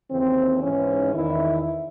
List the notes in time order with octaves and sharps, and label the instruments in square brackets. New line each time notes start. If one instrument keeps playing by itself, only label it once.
[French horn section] D#2 C#3 E3 C4
G#2 E3 C#4
E2 D#3 E4